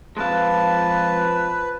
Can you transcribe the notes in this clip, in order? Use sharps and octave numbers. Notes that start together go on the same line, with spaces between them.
F3 G#3 C4 B4 F5 A5